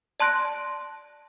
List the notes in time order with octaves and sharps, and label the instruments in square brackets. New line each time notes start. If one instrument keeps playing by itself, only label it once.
[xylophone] D5 A5 C6 F#6 A#6 D7